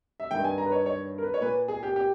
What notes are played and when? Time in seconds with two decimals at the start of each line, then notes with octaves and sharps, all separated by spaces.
0.20 E5
0.31 G2 D#3 G5
0.44 G#5
0.58 A#5
0.66 B4
0.72 C#5
0.86 C#5
1.18 A#4
1.23 B4
1.34 C#5
1.41 A#2 B4
1.68 G#4
1.83 G4
1.96 G4